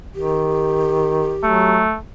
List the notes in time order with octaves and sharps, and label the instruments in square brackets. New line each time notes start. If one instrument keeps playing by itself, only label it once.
[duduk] D#3 [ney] G4
[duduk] F#3 [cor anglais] A3